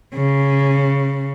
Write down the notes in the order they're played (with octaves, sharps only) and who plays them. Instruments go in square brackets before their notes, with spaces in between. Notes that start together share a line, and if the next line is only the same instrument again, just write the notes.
[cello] C#3